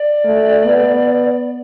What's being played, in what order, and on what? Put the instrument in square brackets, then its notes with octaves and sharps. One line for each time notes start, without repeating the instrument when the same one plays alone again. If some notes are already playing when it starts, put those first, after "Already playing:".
Already playing: [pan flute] D5
[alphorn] A3
B3